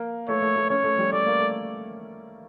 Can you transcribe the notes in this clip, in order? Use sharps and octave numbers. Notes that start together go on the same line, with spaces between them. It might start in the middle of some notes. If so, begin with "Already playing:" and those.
Already playing: A#3
A3 C#5
A3
A3
C#4 C#5
A3
G3
A3 D5
A#3
A3